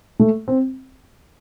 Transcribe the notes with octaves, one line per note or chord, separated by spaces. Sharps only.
A3
C4